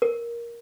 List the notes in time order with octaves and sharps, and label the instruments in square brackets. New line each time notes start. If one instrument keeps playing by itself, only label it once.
[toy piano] A#4